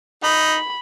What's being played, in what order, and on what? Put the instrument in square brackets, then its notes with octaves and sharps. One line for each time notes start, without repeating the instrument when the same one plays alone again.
[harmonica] D#4 [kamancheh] B5